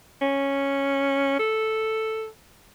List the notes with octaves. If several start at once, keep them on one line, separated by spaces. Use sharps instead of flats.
C#4
A4